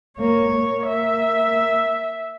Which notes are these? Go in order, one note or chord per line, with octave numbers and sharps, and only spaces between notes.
A#3 C#5
A#3
E5